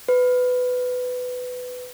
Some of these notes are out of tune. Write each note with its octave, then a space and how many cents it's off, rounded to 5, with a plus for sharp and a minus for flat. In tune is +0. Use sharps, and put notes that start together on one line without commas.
B4 +15